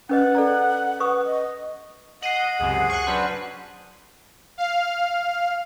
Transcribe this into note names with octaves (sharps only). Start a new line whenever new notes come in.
C#4 B4 D#5 F#5
A4 D5 A#5
B4 C#6 D#6
D#5
D#5 F#5 C7 D#7 F#7
C#2 F#2 C3 G#4
C#6 F#6
F#3 C#4 D4 B4 C5
F5